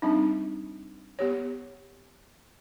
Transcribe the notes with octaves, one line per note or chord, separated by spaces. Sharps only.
G3 C4 D4 D#4
B3 G4 C#5